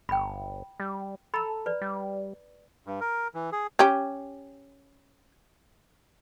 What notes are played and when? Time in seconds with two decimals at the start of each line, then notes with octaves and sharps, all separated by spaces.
0.09 G1 G5 B5
0.80 G3
1.34 A4 A#5 B5
1.66 B4 D5
1.81 G3
2.87 G2
3.00 A#4
3.35 E3
3.53 G#4
3.79 C#4 G4